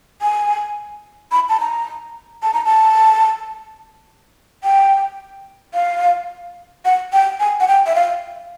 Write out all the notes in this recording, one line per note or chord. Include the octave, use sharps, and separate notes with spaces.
G#5
B5
A5
A#5
A5
A#5
A5
G5
F5
F#5
G5
G#5
F#5
G5
E5
F5